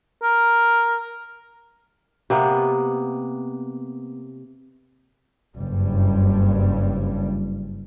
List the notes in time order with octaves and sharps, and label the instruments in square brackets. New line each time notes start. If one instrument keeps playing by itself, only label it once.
[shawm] A#4
[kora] C3 A#3 B3
[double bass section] F#1 G2 G3